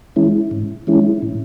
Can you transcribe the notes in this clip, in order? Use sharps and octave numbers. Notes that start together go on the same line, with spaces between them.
E3 G#3 C#4 E4
G#2
E3 G#3 C#4 E4
A2